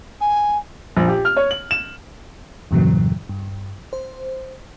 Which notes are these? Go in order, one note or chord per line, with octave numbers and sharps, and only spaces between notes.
G#5
A#1
G4
F6
C#5
F#7
E7
E2 G2 A#2 C#3 E3 F#3
G2
C5